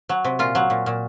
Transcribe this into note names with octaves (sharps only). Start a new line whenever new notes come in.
F#3
C3
A#2 F4
F#3
A#2
A#2